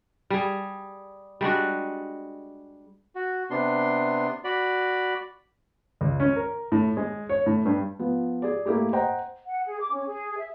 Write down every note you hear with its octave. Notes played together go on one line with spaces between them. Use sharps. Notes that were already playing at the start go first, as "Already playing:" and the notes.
G3 G#4
G3 G#3 D4 F#4
F#4
C3 B3 D4 C6
F#4 D5 B5
C#2
C#4
A#4
A2
G#3
C#5
A2
G2
F3 B3
G#4 D5
A3 A#3 E4 G4 G#4
C5 D#5 F#5 G5 A#5
F#5
G#4
D6
C#4
G#4
E5